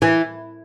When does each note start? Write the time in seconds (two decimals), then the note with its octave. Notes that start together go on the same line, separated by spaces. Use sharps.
0.02 E3